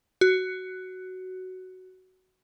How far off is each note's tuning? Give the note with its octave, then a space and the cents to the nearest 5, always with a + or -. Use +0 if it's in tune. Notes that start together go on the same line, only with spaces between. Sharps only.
F#4 +10